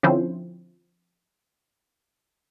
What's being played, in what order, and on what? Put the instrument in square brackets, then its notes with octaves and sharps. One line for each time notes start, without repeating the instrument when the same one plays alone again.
[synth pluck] D3 F3 C4 C#4 E4 C5